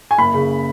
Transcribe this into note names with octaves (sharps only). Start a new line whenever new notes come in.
G#5
F#1 B5
C#3